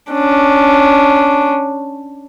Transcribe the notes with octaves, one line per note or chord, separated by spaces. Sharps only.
C#4 D4